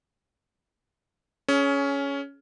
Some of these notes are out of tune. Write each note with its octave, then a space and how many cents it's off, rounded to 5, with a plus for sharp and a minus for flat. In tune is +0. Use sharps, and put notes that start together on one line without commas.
C#4 +10 G#4 +30